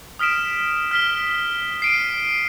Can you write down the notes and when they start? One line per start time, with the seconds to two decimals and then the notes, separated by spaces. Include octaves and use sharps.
0.19 D#6 F6 B6 D7 E7
0.91 F6 B6 G7
1.82 C7 D7 D#7